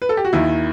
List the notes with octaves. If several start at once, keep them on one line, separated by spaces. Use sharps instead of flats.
B4
A4
G4
F#4
D#2 D#3 E4